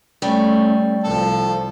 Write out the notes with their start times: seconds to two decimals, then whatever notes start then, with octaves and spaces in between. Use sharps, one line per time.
0.22 G3 A3 C#4
1.04 C2 F3 A4